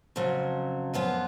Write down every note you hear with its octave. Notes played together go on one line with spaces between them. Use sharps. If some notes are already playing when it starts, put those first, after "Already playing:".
F2 C#3 F#3
F#2 F3 B3 F4